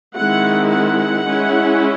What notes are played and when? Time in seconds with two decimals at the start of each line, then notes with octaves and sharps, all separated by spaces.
0.14 D#3 G#3 C4 E4 F#5
0.70 F#5
1.25 G#3 C#4 E4